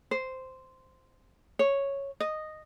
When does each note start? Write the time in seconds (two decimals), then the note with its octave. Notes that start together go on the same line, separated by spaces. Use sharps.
0.11 C5
1.59 C#5
2.20 D#5